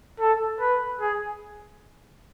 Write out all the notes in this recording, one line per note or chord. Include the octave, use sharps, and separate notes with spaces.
A4
B4
G#4